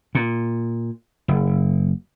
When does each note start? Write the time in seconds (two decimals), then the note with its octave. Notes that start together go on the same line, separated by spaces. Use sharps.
0.15 A#2
1.28 F#1